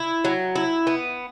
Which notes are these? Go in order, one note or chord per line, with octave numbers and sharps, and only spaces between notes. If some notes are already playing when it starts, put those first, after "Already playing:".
Already playing: E4
F#3
E4
B3